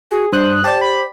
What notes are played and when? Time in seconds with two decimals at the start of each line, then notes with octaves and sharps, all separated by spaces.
0.11 F#4 G#4
0.33 G2 D4 C5 D#6 F#6
0.64 G4 C5 D5 A5
0.81 B5